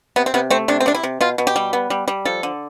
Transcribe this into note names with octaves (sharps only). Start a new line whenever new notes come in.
C3 B3
C4
C3 B3
A3 C4
C3 D4
C4
C3 D4
E4
C3
B2 F4
B2
G4
G3
B3
G3
G3
F3 A4
D3